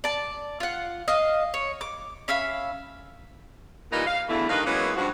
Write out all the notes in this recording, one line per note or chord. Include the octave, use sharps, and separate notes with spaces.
D5 A5
F4 F#5
D#5 F5
C#5
D6
C#4 E5 F5 B5
A#2 E3 G3 D#4 F4 A#4
F5
E2 B2 D3 E3 A3 E4
G2 D#3 A#3 D#4 B4 F5
E3 F#3 G#3 A#3 B3 C#4
G2 F3 F#4